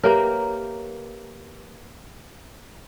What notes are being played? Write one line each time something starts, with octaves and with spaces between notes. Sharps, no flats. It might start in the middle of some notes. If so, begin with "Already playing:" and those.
A#3 G4 A#4 B4 C#5 E5 G5 A#5